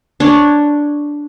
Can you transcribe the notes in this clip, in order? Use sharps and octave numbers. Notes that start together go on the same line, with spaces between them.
D4 C#5